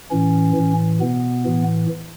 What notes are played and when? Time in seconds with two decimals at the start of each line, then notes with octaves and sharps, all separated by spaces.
0.11 A2 E3 C#4
0.56 A2 E3
1.01 B2 B3
1.46 A2 E3